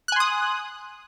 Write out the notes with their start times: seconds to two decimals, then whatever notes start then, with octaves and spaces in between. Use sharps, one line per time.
0.08 F#6
0.12 G#5
0.16 C6
0.20 D#6